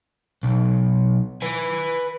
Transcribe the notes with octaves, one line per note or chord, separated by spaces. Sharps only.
B1
B4 G#5